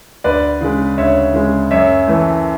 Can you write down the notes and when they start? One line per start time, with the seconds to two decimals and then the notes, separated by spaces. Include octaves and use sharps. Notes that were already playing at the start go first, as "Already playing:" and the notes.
0.24 D2 B4 D5
0.61 C#3 G#3
0.98 D2 C#5 E5
1.34 C#3 G#3
1.71 F#2 C#5 E5
2.07 E3 A3